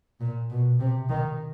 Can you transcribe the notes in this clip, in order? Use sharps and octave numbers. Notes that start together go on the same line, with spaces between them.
A#2
B2
C3
D#3